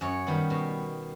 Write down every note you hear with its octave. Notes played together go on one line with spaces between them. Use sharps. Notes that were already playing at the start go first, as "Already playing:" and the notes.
F#2 C#5
D#3 G3 B3
B2